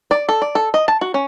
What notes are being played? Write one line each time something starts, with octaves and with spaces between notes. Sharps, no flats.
D5
A4
D5
A4
D#5
A5
F#4
C#4